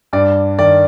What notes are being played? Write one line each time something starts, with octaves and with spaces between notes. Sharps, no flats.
G2 D5
D#3 D5